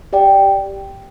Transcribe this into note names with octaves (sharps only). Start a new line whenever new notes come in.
G4 D5 G5